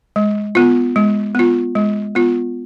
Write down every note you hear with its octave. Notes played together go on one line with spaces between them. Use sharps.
G#3
B3 F4
G#3
B3 F4
G#3
B3 F4